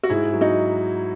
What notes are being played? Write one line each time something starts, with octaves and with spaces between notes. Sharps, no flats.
F#4
G#2 E4 G#4
F#3
D#4 F#4